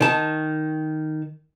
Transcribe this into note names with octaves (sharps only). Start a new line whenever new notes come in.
D#3 A5